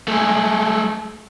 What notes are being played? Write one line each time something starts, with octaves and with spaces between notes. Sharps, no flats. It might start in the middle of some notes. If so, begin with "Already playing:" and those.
G#3 A3